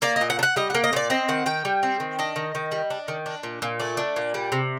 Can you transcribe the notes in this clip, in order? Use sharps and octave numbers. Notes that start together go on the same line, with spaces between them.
A#3 D5
D#5
A#2
F#5
D4
F#5
G3 D#5
A#3 F#5
D#5
A#2 D5
C4 D#5
D#3 F#5
D#3 G5
G3
C4
D#3
D4 D#5
D#3
D#3
G3
D4
D#3
D4
A#2
A#2
A3 D5
D4
A#2
G3
C3